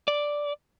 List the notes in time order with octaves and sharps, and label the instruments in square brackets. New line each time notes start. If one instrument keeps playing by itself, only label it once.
[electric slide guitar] D5